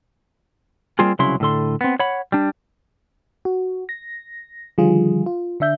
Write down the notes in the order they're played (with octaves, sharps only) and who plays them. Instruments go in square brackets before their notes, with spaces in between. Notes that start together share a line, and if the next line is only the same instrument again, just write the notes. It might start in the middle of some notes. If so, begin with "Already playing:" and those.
[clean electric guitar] G3 A#3 C4 F4 G#4
C2 C#3 F#3 E4 C6
A2 D3 A4 C6
B3 C4
C#5 F#5 B5
G3 D4
[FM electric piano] F#4
A#6
D3 D#3 F3 G3 F4 G#4
F4
D3 D4 E5 G6